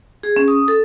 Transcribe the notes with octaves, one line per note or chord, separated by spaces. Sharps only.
G#4
C#4
D#6
A4